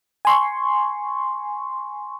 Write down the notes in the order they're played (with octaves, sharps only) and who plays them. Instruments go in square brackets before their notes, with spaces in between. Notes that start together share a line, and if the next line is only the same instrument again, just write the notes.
[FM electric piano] G#5 C6 C#6